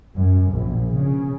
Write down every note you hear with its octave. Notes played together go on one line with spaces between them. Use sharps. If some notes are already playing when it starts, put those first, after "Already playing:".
F#2
A#1
C#3